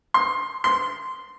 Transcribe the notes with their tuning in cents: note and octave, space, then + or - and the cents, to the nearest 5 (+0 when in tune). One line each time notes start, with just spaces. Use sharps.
C6 +20
C6 -5